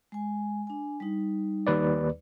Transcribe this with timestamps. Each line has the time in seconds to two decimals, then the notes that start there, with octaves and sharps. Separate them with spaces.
0.12 G#3 G#5
0.67 D4 G#5
1.00 G3 D#4
1.67 D#2 B4 D5